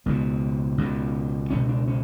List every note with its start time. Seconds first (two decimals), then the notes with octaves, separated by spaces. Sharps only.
0.06 C#2 B2 B3
0.78 C#2 B2
1.50 C#2 B2 C#4
1.69 D4
1.87 C#4